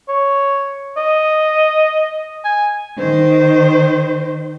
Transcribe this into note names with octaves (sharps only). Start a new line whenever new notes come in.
C#5
D#5
G#5
D#3 C5